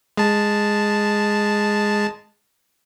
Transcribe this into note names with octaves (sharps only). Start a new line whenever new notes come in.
G#3 A5